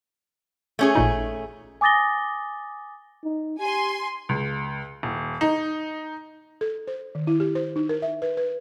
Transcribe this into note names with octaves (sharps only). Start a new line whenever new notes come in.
A3 C#4 G#4
A1 A#2 D#4
G#5 D6 D#6 A6 A#6 G7
D#4
G4 G#5 C6
C#2
D#1
D#4
A4
C5
D#3
E4
G4
C5
D#4
A#4
E5
B4
B4